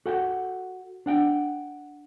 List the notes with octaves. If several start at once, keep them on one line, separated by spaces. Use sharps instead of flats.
F#4 A4 F#5 G5
D4 F#5 G5